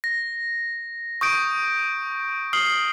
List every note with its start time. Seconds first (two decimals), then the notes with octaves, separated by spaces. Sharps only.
0.04 A#6
1.21 C#6 D#6 G6 D7
2.53 D#6 F6 C7 F#7 G7